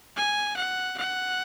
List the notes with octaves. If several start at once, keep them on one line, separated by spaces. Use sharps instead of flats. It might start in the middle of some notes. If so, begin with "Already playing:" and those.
G#5
F#5
F#5